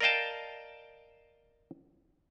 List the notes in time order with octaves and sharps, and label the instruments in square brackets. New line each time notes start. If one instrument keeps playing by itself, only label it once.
[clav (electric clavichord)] A#4 D5 D#5 F5 G5 A5